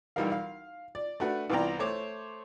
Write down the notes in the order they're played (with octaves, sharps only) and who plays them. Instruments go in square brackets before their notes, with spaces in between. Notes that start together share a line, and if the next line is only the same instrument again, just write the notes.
[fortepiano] B1 E3 G3 D#4 A#4 F5
F5
D5
A3 D4 F#4 B4
C2 E3 B3 D5 G5 A#5
A3 C5 C#5 D6